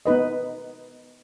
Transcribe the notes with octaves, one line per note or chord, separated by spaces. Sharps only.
B3 D#4 B4 D#5